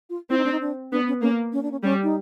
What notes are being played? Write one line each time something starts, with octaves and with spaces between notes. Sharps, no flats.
F4
C4 E4
D#4
D4
D#4
D4
B3 D4
C#4
A#3 C#4
C#4
D4
C#4
G3 C#4
D#4